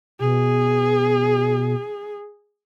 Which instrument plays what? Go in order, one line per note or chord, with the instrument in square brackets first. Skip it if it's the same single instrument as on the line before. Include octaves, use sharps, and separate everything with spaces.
[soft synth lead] B2 [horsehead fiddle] G#4